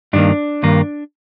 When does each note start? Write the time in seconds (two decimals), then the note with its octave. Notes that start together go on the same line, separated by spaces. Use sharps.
0.13 G2 D#3 A#3 D4
0.63 G2 D#3 A#3